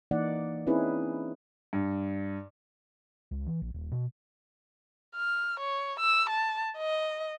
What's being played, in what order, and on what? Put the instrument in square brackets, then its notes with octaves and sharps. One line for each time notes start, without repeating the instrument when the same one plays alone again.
[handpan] E3 A#3 D#4 D5 F#5
C4 C#4 D#4 E4 G#4 B4
[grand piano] G2
[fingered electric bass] C#2
E3
A#1
D#1
B2
[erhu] F6
C#5
E6
A5
D#5